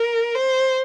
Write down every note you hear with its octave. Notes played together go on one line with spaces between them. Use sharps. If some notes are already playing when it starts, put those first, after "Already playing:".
Already playing: A#4
C5